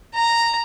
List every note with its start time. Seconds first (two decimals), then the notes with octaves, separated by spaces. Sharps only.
0.14 A#5